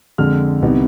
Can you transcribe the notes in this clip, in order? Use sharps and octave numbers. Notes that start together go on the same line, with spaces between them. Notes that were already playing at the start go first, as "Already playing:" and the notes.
F2 D3 G#3 F6
C2 C3 G3 B3 D#4